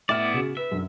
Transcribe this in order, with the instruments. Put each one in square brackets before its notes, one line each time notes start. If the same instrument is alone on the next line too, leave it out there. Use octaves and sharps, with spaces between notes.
[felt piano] A2 E5 F6 [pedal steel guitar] B3 E4 D5
[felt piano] C#3 F#4
[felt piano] B4 [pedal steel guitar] E5
[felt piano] F#2 D3